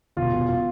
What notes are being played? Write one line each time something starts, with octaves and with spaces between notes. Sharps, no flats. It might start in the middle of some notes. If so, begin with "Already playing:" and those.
E1 F4
E1
F4